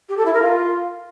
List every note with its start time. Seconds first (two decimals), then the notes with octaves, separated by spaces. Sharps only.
0.09 G4
0.17 A4
0.26 E4
0.34 A#4
0.42 F4